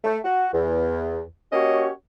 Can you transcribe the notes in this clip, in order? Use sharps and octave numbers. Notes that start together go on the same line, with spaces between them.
A3
F#4
E2
A#3 C#4 F#4 G4 C#5 D#5